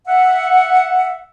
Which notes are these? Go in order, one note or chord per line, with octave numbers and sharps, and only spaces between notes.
E5 F#5